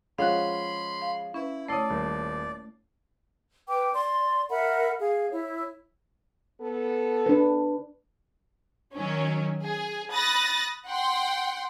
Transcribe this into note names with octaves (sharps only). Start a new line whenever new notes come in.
F3 G#3 C#4 F5 F#5 B5 C6 F#6
F5
C#4 E4 B4
A3 E4 C#5 D5 D#6 C7
D#1
B4 G5 D6
D5 C6
A#4 E5 F#5 B5
G#4 F5
E4 C#5
B3 A4
D4 B4
D#3 F#3 C#4
G#4
B5 D#6 F#6 A6 A#6
F#5 G5 C6